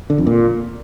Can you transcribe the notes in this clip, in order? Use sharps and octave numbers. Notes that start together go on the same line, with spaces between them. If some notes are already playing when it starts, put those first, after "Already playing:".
D3
F2
A#2